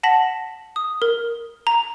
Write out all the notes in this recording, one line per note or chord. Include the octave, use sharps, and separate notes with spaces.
F#5 A5 A#6 B6 F#7
D#6
A#4
A#5